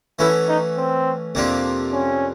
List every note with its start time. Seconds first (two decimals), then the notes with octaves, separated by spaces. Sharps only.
0.19 E3 A3 C#4 E4 F#4
0.48 D#4
0.77 C4
1.35 F2 C3 F3 A#3 D4
1.93 C#4